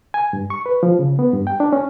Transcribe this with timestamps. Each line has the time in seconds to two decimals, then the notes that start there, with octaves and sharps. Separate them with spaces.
0.14 G#5
0.33 G2
0.50 C#6
0.66 B4
0.83 F3
0.99 C#3
1.19 B3
1.33 G2
1.47 G5
1.60 D4
1.73 C#4